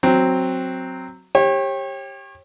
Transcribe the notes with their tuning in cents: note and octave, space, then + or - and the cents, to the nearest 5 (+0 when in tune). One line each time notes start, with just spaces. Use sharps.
F#3 +0 C4 +0
G4 +10 C#5 -35